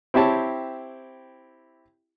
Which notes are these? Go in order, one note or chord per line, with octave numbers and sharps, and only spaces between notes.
C4 E4 G4 C#5 A5